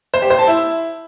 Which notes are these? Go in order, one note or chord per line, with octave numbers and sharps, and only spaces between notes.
C5
G4
C5
A5
E4